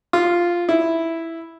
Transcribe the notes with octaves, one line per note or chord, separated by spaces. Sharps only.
F4
E4